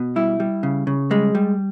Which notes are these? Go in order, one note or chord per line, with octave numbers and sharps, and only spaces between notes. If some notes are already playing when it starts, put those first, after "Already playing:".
Already playing: B2
G3 E4
G3
C#3
C#3
G3 G#3
G3